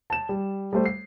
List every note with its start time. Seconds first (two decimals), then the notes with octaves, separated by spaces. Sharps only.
0.10 A5 E7
0.29 G3
0.73 G3 A3 C5
0.85 C7